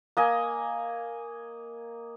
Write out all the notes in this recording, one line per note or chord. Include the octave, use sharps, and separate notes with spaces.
A#3 D#5 G#5